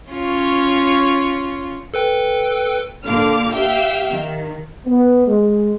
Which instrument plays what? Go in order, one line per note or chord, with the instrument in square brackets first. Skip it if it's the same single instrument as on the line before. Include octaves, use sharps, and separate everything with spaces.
[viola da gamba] C#4 F4 C#5
[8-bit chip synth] A4 B4 G5
[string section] A#2 D3 F5 D6 F6
G4 E5 F5 G5
D#3
[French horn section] B3
G#3